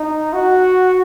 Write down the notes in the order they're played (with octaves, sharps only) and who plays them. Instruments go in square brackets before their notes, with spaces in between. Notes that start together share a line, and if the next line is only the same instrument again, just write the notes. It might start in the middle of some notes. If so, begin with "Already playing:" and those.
Already playing: [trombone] D#4
F#4